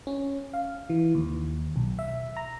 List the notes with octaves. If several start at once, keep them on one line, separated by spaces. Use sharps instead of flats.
C#4
F5
E3
D#2
B1
E5
A#5